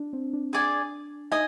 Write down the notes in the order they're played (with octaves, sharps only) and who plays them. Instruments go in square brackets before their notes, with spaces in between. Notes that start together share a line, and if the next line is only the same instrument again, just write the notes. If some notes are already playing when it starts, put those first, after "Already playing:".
Already playing: [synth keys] D4
C4
D4
[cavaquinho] G#4 D5 G#5
[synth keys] D#4 [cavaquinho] D#5 G#5